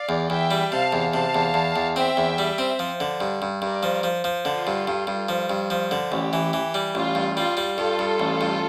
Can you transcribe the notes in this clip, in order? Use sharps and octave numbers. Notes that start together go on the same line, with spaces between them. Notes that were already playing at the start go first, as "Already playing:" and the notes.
Already playing: D5 F5
E2
E2 E5 G5
G3
C3 F5 A5
E2
C3 F5 A5
E2
E2
E2
C4 E5 G5
E2
G3
C4
F3
D3
G2
G2
G2 A#4 D5
F3
F3
F3
D3 F4 A4
G2
G2
G2
F3
G2
F3
D3
A1 G4
E3
E3
G3
A1 F4
G2
G3 F4
G3
G2 F4 A4
G2
A1
G2